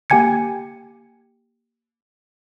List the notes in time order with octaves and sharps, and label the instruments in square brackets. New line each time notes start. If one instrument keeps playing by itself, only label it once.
[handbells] A#3 G4 G5 G#5 G#6 C#7